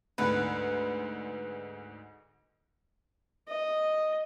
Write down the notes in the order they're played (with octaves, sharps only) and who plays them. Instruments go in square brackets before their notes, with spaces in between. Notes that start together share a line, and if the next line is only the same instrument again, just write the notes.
[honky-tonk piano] D2 G#2 [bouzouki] B4
[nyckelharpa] D#5